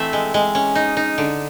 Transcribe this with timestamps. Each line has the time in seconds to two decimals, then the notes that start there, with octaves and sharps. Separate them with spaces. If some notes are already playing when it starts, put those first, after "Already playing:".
Already playing: E3 A3 C4 E5
0.13 G#3
0.34 G#3
0.55 C#4
0.75 D#4
0.97 D#4
1.18 D3